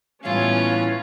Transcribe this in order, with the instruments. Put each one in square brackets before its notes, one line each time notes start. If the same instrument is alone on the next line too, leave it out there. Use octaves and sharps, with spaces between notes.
[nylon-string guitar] A2 E3 G3 [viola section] B3 C#4 [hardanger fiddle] F4